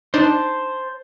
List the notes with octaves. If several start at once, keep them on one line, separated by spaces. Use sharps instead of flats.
D4 D#4 C5 A5